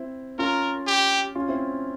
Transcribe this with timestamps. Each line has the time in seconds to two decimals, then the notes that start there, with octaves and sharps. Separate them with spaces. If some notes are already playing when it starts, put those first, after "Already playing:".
Already playing: C4 E4
0.38 C#4 F4 A#4
0.87 G4
1.35 C#4 F4
1.49 C4 E4